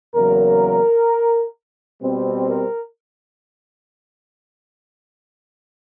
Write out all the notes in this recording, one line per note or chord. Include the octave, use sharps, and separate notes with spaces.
E2 C#3 F#3 A#3 A#4
B2 G3 C4
A#4